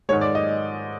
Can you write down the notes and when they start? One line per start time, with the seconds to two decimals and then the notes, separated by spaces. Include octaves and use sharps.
0.09 G#2 D#3 G#3 C#5
0.21 D5
0.35 D#5